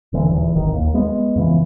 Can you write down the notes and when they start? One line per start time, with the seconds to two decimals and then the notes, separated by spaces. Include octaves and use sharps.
0.13 D#1 D3 E3
0.28 D#1 E2
0.55 D1 G#1 D#3
0.74 D#2
0.94 G#3 B3
1.36 F2 C#3 E3